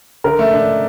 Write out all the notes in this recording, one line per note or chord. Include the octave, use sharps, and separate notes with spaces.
D3 A#4
A3
D4